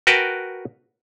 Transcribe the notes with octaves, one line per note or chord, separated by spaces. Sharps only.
F#4 A#4 B4 G5 A5